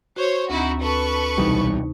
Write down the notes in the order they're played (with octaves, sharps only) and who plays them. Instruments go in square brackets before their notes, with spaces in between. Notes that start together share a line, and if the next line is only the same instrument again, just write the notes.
[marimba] F#4 [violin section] C5 C#5
[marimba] D2 C4 [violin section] D#4 E4 F#4
[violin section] A4 B4 C#6
[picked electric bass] B1 E3 G3 [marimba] C3 D#4